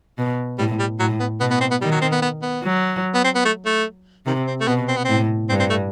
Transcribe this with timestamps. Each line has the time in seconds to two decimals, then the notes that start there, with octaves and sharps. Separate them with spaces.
0.18 B2
0.58 A2 G3
0.79 G3
0.99 A2 F#3
1.20 B3
1.40 B2 B3
1.51 B3
1.61 C4
1.71 B3
1.81 D#3 G3
1.91 F#3
2.02 C4
2.12 B3
2.22 B3
2.42 B3
2.63 F#3
3.14 B3
3.24 C4
3.35 B3
3.45 A3
3.65 A3
4.26 C3 D#3
4.47 C4
4.61 A3
4.67 B2 B3
4.88 C4
4.97 B3
5.05 A2 C4
5.49 G2 C4
5.60 C4
5.70 A3